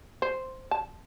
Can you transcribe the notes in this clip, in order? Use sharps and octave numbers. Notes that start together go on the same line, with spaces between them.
C5
A5